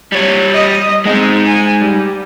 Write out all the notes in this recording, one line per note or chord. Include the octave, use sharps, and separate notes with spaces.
G3 C#5
D#5
G#3 C4 D#4
G#5
G3